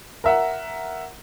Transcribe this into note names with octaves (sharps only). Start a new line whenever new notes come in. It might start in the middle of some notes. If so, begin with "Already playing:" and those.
A#4 E5 F#5